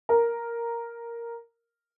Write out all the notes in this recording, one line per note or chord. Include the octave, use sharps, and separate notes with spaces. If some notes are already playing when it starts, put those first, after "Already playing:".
A#4